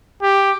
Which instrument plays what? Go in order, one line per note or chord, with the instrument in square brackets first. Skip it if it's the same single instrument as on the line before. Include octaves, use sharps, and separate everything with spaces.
[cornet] G4